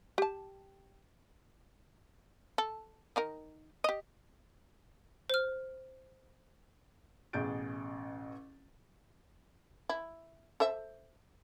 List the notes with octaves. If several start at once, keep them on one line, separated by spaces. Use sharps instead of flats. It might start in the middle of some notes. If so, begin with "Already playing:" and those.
G4 A5
A4
D#3 D#4 A#4
G4 D#5
C5 F6
A1 B2 G#4 G6 A6 D7
E4
A4 C5 E5